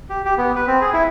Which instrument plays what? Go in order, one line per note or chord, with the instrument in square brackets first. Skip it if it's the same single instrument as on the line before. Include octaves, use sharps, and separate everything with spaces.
[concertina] G4
G4
B3
B4
C4
G#4
E4